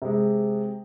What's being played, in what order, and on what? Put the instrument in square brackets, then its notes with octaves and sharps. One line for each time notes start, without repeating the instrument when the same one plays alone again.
[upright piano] C3 G#3